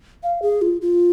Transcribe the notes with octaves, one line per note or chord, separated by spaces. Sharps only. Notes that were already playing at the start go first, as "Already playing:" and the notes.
F5
G#4
F4
F4